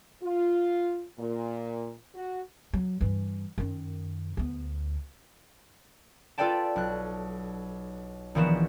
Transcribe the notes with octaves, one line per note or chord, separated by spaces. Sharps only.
F4
A#2
F#4
F#3
G2 E3
F#2 D#3
D2 B3
F4 A4 B4 D5 G5 A5
B1 F#6
A#1 D#3 E3 B3 F#4 E7